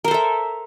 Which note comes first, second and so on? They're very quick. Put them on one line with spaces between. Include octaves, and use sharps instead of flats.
A#4 C5 A4 E5